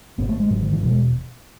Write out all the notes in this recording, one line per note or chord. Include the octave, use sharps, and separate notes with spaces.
G#1 G#2 B3
A3
G#3
G#1 G#2 F#3
D#3
E3
E1 E2 B2 F#3
G#3